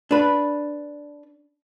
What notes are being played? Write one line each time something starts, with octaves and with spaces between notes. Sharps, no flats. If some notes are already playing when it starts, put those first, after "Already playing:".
D4 B4